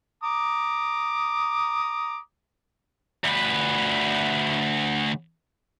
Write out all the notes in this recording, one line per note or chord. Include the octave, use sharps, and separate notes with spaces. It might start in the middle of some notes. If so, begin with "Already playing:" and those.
A#5 D6 D#6
D2 B4